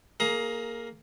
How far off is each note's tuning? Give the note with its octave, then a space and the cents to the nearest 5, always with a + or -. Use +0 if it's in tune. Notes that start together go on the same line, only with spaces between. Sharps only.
A#3 +0 G#4 +25 A#5 +15